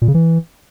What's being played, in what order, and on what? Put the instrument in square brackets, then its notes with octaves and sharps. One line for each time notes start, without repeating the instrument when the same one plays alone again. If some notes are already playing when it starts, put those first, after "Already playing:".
[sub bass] A#2
C#3
E3